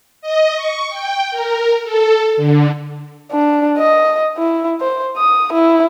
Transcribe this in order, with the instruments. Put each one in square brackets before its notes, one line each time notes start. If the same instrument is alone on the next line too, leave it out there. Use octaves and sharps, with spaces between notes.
[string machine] D#5
C#6
G5
A#4
A4
D3
[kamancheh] D4
D#5
E4
C5
D#6
E4